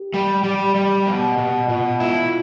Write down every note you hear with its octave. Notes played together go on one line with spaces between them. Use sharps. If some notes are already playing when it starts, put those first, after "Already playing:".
Already playing: G4
G3
G3
G3
B2
B2
B2 F4
E4